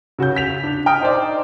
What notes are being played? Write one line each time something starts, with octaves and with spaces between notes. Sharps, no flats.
C#3 F#4 C#5 G6
B6 F7
D4
G5 A#5 D#6 F6 D7
D#4 C5 D5